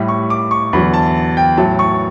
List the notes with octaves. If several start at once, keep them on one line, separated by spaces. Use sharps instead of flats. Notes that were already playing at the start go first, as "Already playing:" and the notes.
Already playing: A2 G3 B5
C#6
D6
C#6
E2 D3 F#3 B5
A5
G5
A2 F#3 A5
C#6